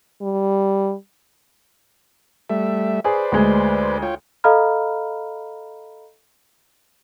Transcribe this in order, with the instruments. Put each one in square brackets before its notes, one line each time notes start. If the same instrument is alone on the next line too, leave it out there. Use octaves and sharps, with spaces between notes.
[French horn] G3
[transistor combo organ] G3 A3 E5
[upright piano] G#4 [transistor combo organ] B4 C5 D5
[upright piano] D2 G#3
[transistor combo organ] F4 C#5 G5
[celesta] A4 D#5 F5 A#5 B5 F6